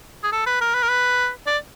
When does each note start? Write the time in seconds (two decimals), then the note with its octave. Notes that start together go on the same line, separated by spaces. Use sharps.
0.23 G#4
0.32 A4
0.46 B4
0.61 A#4
0.74 B4
0.83 A#4
0.89 B4
1.47 D5